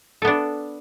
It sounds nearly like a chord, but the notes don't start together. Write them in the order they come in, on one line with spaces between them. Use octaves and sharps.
A4 B3 D4